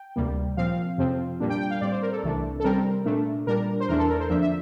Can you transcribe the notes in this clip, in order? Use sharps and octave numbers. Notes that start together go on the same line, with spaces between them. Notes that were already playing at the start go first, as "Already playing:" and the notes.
Already playing: G5
D2 C3 G3 A#3
A#2 F3 C4 F5
F2 C3 F3 C4
A#2 G3 A#3 D4
G5
G5
F5
A2 G3 C4 D5
C5
A#4
A4
C2 C3 E3 A3 D4
A4
C3 G3 C4 A#4
A#2 A3 D4
A#2 G3 D4 A#4
C5
E2 E3 A3 D4 A#4
A4
A#4
C5
F2 D3 F3 A#3 D4 E5
E5